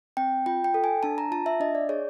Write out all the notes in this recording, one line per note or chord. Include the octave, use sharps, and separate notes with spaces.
C4 G5
F4 G5
G5
A4
G#5
D4 A5
A#5
F4 A5
E5
D4 D#5
D5
G#4 C#5